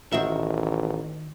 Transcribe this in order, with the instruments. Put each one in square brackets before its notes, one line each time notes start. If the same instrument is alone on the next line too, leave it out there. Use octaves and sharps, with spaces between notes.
[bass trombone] A1 [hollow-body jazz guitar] D#3 F#4 E5